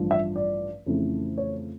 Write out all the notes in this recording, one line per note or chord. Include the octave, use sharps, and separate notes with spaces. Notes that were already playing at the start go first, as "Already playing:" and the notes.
Already playing: A1 G2 F3
E5
D5
F2 C#3 E3 A3
C#5